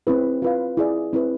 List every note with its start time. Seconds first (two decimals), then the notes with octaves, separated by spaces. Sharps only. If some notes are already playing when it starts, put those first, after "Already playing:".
0.07 C4 E4 G#4 B4
0.42 F4 B4 F5
0.77 E4 G#4 D5
1.13 C4 E4 B4